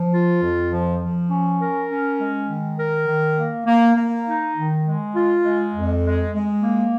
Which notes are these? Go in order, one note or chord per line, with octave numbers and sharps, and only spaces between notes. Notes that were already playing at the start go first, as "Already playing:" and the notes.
Already playing: F3
F4
F2
F3
F3
C#4
A#4
C#4
G#3
D#3
A#4
D#3
A#3
A#3
A#3
D#4
D#3
G#3
F4
G#3
F2
G#3
G#3
A#3